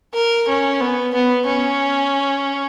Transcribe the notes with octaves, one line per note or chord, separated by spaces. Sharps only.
A#4
C#4
B3
B3
C#4